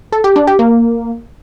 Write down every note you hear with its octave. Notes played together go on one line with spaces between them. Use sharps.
A4
G4
D4
G4
A#3